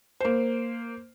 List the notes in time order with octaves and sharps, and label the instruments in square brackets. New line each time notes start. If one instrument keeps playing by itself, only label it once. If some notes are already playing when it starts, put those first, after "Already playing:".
[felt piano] A#3 C5